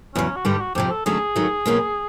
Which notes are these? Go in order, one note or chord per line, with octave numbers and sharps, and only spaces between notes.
E2 C#3 F#3 C#4
F#4
G2 D3 G3 G4
F#4
F2 C3 F3 G4
A4
D3 F#3 A3 C#4 G#4
D#3 F#3 A3
B2 F#3 A#3 C#4 F4